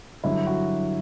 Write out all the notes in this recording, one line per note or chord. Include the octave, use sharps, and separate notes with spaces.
G2 D3 F#3 E4
F#4